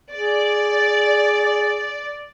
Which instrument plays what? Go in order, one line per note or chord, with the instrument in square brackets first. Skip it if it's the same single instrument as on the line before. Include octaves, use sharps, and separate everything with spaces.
[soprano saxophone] G#4 [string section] D5